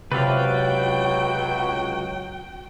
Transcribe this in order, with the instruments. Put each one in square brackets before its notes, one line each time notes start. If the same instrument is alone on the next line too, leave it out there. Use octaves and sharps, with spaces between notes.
[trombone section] C#2 F#3 [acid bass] C3 [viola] F#4 G5 [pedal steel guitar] B4 D5 F5